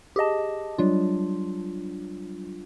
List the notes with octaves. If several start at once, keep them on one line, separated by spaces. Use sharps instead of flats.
G4 G#4 D#5 A5
F#3 G3 D4 F4